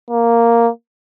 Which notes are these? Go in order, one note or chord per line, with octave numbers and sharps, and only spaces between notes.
A#3